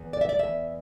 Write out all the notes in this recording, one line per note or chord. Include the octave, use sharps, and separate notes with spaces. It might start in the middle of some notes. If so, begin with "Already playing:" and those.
Already playing: E2
D5
E5
D5
E2 B2 E5